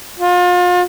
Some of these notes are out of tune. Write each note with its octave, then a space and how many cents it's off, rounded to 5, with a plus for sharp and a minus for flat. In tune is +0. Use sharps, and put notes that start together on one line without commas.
F4 +35